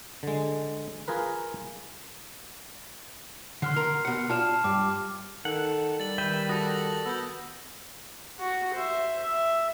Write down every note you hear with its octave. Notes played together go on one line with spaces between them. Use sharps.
D3 G#3
F4 G#4 A#4 B4
D3 C6 F6 C7
A#4
B2 F#5
F4 D5 F5 A5 F6 E7
G2 D6
D#3 A4 F#5
G3 A6 F#7
D#3 B4 E5 G5
F#4 A4 D#6 A#6
A#6 F#7
B3 E6 G6
F#4
C5 E5
E5